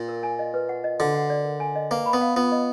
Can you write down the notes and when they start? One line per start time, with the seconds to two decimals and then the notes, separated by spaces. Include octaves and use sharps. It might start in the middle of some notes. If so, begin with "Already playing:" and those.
Already playing: A#2
0.09 A#4
0.23 G#5
0.39 D#5
0.54 B4
0.69 F#5
0.84 D#5
1.00 D3 F#4
1.15 F#5
1.30 D5
1.45 A#4
1.60 G#5
1.76 D#5
1.91 A#3 B4
2.06 B5
2.13 B3
2.21 F5
2.36 B3 F4
2.52 D#5